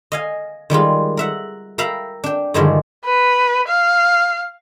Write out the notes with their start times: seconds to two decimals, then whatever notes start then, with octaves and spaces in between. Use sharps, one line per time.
0.12 D#5 F5 G#5
0.70 D#3 G3 G#3 F4
1.17 A#4 E5 F#5
1.78 A#4 E5 F5 G5 A#5 B5
2.24 D4 G5
2.54 G2 D3 D#3 F3 G#3 A3
3.05 B4
3.68 F5